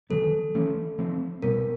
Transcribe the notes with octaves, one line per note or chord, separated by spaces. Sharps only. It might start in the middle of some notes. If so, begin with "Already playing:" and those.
D#3 F#3 B3 A4
E3 A3 C#4
F3 A3 C4
B2 G3 B3 A#4